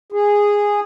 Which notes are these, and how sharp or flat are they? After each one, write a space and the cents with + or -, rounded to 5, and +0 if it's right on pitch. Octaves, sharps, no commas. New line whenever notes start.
G#4 -10